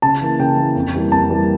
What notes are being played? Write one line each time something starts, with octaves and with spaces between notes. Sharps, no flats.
C#3 A5
E3 A#3
C#3 G5
E3 A#3
F2
E3 G3 A#3
F2 A5
E3 G3 A#3